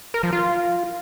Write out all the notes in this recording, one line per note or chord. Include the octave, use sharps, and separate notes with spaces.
A#4
F3
F4